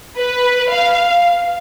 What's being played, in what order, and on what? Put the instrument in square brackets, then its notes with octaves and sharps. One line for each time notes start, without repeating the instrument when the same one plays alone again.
[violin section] B4
F5